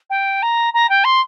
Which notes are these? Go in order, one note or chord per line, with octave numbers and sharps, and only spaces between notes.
G5
A#5
A#5
G5
C6